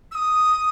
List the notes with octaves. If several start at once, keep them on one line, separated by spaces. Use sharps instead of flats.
E6
D#6